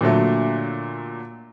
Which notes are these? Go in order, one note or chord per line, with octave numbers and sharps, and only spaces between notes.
A#2 D3 F#3 A3